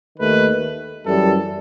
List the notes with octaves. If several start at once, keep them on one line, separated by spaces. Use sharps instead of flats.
D#2 D#3 A3 B4
F#2 E3 G3 A4